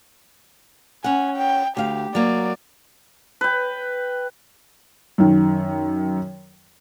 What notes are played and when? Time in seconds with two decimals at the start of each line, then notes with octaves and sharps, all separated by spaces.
1.04 C#4 F#5 G#5
1.36 G5
1.77 D2 G4 F5
2.15 F#3 A#3 D5
3.41 B4 G5
5.18 F#2 D#3